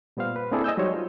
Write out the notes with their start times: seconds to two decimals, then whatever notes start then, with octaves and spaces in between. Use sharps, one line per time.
0.17 A#2 G3 B3 C5 F5
0.36 B4
0.51 A#3 C4 D4 E4 G#4 A4
0.64 D#5 G#5 E6 G6
0.77 F#3 G3 D#4 C5 C#5
0.93 F4